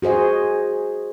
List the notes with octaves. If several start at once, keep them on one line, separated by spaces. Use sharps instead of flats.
F#4 G#4 C5 D#5